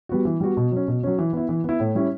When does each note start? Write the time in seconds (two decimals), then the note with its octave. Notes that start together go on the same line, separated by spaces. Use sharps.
0.09 G3 B3 F#4
0.25 E3
0.40 G3 B3 F#4
0.57 B2
0.72 F#3 C#4
0.88 B2
1.03 F#3 C#4
1.19 E3
1.33 B3 E4
1.49 E3
1.64 B3 E4
1.80 A2
1.95 G3 C#4 E4